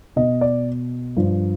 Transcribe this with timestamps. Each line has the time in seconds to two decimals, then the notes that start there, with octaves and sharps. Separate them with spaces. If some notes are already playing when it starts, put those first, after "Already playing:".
0.16 B2 D#5
0.41 D5
1.17 G2 F3